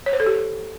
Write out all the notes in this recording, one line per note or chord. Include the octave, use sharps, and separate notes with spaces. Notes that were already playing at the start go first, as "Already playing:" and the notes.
C#5
C5
A4
G4